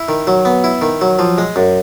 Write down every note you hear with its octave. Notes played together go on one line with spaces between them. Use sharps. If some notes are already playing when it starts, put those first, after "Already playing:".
Already playing: E4
D#3
F#3
B3
E4
D#3
F#3
F3
G#3
F#2